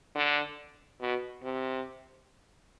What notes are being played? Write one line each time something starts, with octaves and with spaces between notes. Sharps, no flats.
D3
B2
C3